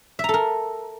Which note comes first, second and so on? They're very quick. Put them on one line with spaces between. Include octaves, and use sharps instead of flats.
E5 A#5 A4 A#4